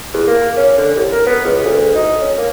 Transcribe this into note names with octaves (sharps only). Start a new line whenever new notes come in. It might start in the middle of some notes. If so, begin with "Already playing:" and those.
E2
A#3
C#4
D3
C2
A#4
B3
C#2
D2
D#4
C#4
A#3